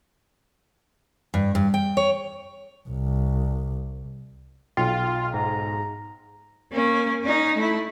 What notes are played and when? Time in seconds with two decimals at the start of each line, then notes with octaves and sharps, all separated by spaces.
1.34 G2
1.55 G2
1.74 G5
1.97 C#5
2.89 C2
4.77 B1 F4 G5
5.34 G#2 A#5
6.72 A#3 C#4
7.21 C#4 D#4
7.56 A3 E4